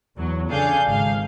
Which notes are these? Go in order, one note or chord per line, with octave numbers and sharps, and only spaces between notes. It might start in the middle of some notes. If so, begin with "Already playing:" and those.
E2 F#3
C#3 D4 G#4 A4 F5 G6
G#1 F5